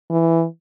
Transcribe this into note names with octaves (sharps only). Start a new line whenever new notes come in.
E3